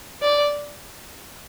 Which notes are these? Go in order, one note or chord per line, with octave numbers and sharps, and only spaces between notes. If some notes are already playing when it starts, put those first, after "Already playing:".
D5